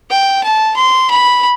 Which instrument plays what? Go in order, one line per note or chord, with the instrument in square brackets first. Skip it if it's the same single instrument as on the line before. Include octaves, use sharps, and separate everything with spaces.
[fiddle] G5
A5
C6
B5